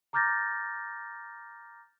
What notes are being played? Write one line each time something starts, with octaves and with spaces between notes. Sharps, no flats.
A#5 D6 F6 G6 A6 A#6